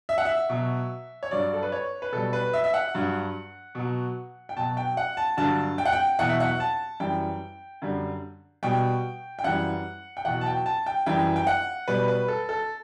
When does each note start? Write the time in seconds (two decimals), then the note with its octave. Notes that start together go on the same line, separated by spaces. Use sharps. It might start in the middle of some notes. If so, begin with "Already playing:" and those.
0.09 E5
0.18 F#5
0.25 E5
0.49 B2 F#3
1.23 C#5
1.31 G2 F#3 D5
1.53 A4
1.63 B4
1.72 C#5
2.02 B4
2.12 B2 G3 A4
2.33 B4
2.53 E5
2.64 E5
2.74 F#5
2.94 G2 F#3
3.75 B2 F#3
4.49 G5
4.56 B2 F#3 A5
4.77 G5
4.97 F#5
5.17 A5
5.37 G2 D3 F#3 A5
5.78 G5
5.85 F#5
5.92 G5
6.19 E2 B2 F#3 F#5
6.29 E5
6.40 F#5
6.60 A5
7.00 F#2 E3 G3 G5
7.82 F#2 D3 G3
8.63 B2 G3 G5
9.39 G5
9.44 F#2 E3 G3 F#5
10.17 G5
10.25 E2 B2 F#3 F#5
10.41 A5
10.46 G5
10.66 A5
10.86 G5
11.06 F#2 E3 G3 G5
11.36 G5
11.47 F#5
11.88 B2 G3 B4
12.08 B4
12.28 A4
12.49 A4